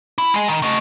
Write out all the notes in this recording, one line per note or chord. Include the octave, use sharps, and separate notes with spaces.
E4
G#3
D#3
A3 D#5